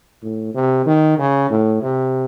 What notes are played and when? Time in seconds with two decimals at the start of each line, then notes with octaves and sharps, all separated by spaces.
0.22 A2
0.55 C3
0.86 D#3
1.18 C#3
1.50 A2
1.82 C3